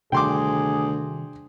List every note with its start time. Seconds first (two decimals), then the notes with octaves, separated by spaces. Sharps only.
0.12 D2 C3 D#3 G3 G#4 G5 C6 D6